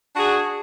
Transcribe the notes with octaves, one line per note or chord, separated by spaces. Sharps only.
D4 F#4 G#4